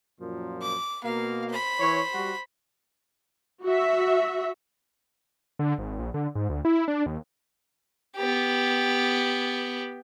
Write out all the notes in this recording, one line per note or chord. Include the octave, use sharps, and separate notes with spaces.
F#2 A#2 F3
D6
B2 A#3 F5
C5 B5
E3 C#5
G3 F#4
F#4 E5
D3
G#1
A#1
D3
G#2
D2
E4
D4
D#2
B3 G4